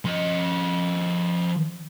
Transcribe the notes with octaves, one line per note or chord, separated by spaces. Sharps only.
F3 D#5